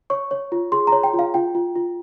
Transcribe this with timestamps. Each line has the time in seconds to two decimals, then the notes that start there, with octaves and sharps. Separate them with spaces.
0.10 C#5 C#6
0.31 C#5
0.52 F4
0.72 G#4 C6
0.87 A#5
0.92 C#5
1.03 G5
1.14 F4
1.19 F5
1.34 F4 G5
1.55 F4
1.76 F4